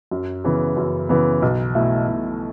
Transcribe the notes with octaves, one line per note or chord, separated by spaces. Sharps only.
F#2
C#3 E3 B3
F#2
C#3 E3 B3
B1
B2 A3 E4
B1